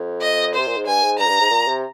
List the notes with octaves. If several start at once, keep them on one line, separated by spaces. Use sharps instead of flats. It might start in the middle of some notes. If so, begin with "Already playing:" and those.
Already playing: F2
D#5
C3 C5
A#2
G#2
G2 G#5
G#2
G2 A#5
F2
G2
G#2
A#2
C3